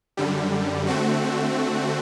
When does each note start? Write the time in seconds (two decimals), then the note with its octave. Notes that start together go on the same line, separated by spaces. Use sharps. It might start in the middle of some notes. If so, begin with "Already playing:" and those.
0.17 F#2 D3 G3
0.87 D3 A3 C4 F#4